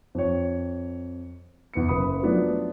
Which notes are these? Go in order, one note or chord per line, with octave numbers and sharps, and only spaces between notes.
F2 C#5
E2 B3 C#7
F#1 B4 B5 D#6
F3 F#3 A3 B3 D4